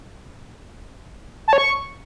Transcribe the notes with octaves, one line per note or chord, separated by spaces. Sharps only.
A5
C#5
C#6